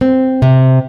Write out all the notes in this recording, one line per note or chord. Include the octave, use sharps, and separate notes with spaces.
C4
C3